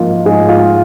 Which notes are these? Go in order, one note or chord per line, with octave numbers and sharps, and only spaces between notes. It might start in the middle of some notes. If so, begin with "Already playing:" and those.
Already playing: G#2 F3 A#3 F4
G#2 G#4
F4